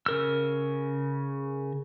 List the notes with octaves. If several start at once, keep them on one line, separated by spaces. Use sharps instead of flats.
C#3 A#4 E6